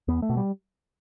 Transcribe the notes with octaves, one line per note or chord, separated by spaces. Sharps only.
E2 B3
A3
B2
G3